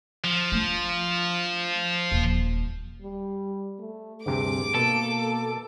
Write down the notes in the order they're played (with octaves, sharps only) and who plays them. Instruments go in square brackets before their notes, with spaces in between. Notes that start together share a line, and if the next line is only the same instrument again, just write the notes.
[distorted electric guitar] F3
[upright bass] A3 D4
D#1
[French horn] G3
A3
[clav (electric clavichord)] D2 G2 C3 [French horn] G#4 [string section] D6
[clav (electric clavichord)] B2 [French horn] A#3 [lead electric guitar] A4